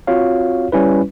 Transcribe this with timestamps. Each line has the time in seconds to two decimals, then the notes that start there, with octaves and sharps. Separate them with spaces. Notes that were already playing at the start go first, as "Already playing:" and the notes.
0.07 C4 F4 F#4 C#5 F5
0.72 G3 C#4 E4 B4